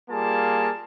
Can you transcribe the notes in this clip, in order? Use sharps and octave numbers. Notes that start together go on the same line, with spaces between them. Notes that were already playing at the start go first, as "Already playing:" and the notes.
G3 A#3 F4 G#4 A5